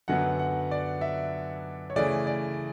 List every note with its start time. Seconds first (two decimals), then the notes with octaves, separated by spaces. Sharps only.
0.08 F#2 D3 F#3 B3 F#5
0.39 F#5
0.71 D5
1.01 E5
1.90 C#5
1.96 C#3 E3 A3 D5
2.27 D5